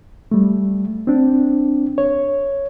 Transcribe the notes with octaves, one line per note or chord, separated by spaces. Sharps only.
G3 A3
C4 D4
C#5